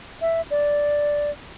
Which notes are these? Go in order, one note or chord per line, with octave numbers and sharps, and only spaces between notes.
E5
D5